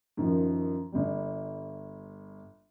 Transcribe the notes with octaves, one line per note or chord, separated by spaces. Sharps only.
F#2 D#3 F3
G1 G3